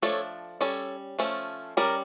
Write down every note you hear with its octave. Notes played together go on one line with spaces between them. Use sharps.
F3 A3 D4 A4 C#5
G3 C#4 A4 C#5
F3 A3 C#4
G3 C#4 A#4 D5